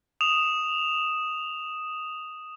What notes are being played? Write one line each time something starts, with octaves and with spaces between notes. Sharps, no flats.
D#6 E7 F7